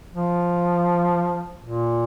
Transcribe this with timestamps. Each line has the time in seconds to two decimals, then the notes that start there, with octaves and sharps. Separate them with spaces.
0.13 F3
1.63 A#2